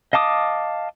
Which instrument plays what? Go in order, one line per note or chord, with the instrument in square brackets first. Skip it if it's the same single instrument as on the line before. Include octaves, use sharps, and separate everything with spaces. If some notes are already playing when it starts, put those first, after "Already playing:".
[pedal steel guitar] D#5 F5 A5 D6 D#6